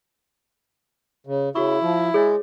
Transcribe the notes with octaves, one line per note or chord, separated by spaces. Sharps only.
C#3
C#3 E4 F#4 C#6
F3
G#3 G#4 C#5 D#5